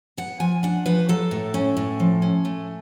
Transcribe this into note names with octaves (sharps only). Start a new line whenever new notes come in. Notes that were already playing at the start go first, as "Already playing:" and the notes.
B3 F#5
F3 G#5
D4 F#5
F3 B4
F#3 A4
A2
C#4
A2
F3
C#4
A3